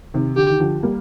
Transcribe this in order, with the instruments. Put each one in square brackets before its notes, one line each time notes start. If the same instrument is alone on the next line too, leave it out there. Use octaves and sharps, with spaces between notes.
[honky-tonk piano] C3 D#3
[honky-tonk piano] D3 [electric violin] G4
[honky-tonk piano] D#3
D3 F3
G3 A#3